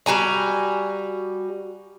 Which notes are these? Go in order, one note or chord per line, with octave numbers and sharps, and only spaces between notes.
G3 F#4 G#5 A#5